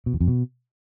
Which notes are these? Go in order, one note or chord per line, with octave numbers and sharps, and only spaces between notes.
B2
E2
F2
B2